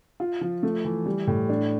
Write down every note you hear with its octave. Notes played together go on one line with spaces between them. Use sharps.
F4
F3
A3
E3
G3
A2
D4